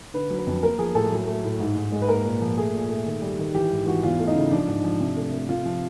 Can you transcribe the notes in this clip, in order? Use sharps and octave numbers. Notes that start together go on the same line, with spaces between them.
D3 B4
F#3
B4
F2
A#3 A#4
F3 G#4
A2 A4
F#3
A3
A2
G#2
G#2
G#3
B4
A#3 A#4
A#2
F3
A3 G#4
A#2
A3
D#3
G3
D#3
E3 G4
G#2
E3 F#4
E2 F4
A3
D#4
C#3
F3 D4
G#2
F3
C3
A3
A3
C3 F4
F3